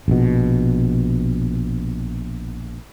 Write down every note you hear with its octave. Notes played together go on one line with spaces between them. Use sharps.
A#1 B2